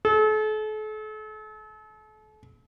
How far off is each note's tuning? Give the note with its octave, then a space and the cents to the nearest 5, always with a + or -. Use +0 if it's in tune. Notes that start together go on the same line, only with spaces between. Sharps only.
A4 -40